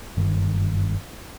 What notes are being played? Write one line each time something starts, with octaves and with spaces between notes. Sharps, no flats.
F#1 G2 D#3